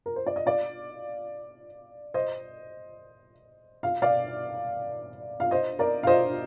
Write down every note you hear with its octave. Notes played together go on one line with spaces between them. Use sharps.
A#4
C5
D5
D#5
D5 F5
C5 D#5
F5
D5 F5
F5
C5 D#5
A#4 D5
F5
C5 D#5